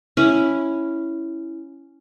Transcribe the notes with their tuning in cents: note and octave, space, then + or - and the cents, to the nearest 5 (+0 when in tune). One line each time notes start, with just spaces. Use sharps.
C#4 +0 E4 +0